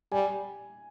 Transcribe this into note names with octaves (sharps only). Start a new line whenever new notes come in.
G3 G#5